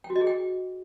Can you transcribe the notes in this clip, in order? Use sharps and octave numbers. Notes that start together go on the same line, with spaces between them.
G5
F#4
D#5
G#4
G5